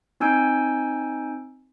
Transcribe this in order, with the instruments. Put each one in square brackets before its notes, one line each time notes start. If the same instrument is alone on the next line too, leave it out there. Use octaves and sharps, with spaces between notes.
[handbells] C4 D#4 G#5 E6 G6 D7